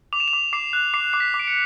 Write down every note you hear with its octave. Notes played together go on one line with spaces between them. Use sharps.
D6 F7
E7
F7
D6
D6 C7
F#6
D6 C7
D6 C7
B6
D6
D7
C#7